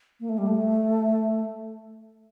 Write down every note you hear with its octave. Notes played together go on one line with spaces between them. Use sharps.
A#3
A3
G3
A3